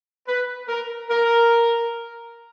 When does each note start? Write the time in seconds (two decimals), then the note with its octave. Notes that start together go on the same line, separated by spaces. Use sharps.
0.28 B4
0.68 A#4
1.10 A#4